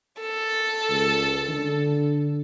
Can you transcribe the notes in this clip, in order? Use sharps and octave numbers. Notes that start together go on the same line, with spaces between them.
A4
C#2
D3